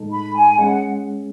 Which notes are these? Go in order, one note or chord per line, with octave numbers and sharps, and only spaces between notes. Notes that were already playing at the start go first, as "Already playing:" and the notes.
Already playing: A2 G#3 D#4 A4
B5
G#5
G#3 C#4 G#4 F#5